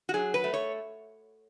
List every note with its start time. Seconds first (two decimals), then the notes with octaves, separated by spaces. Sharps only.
0.09 F#4
0.14 F#3 G#4
0.34 B4
0.44 A3
0.54 C#5